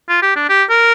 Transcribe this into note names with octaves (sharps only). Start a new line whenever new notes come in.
F4
G4
D4
G4
A#4